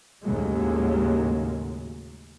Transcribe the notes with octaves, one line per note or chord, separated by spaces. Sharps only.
D#2 A2 C#3 F#3 G#3 A#3